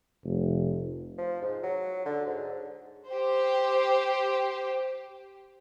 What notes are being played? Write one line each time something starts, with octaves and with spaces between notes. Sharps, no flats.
F1
F3
G#2
F#3
D3
G#2
G4 C5